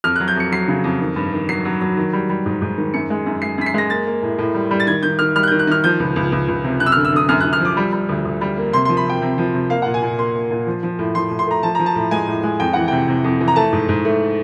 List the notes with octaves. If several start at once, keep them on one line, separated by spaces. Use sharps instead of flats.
F2 F6
F#6
F#3
G6
F2 C#7
F#3 C7
C#3
F2
D#3
G2
D#3
F#3 C7
F#3
F#3
D#3
G3
G3
G#2
G#2
D#3
F#2 C#7
G#3
F#2
G#3 C7
F#2 B6
C7
G#3 A#6
A#3 A6
A#3
A2
A2
G3
G3
A6
D#3 G#6
D#3 G6
D#3 F6
G3 F6
F#6
G6
D#3
F#6
D#3 F6
F3 G6
C#2
C#2
C#2
C#2
C3
F#2 F#6
E6
F6
D3
E6
D3 D#6
F#2 F6
F#6
F#2
F6
F3 D6
G3
G3
D2
D2
G3
A#3
C3 C6
C6
F3
B5
C3 G5
C3
F3
C3
A#3 F5
F#5
A#2
G#5
A#2
A#3 C6
A#3
A#2
F3
F3
A2
F3 C6
A2
C6
A3 A#5
F3 A5
F3 A#5
A5
A2
G#3 G#5
A2
G#3
F2 G5
E3 F#5
C3 G5
C3
F2
E3
A#5
A3 A5
G#2
G#2
A3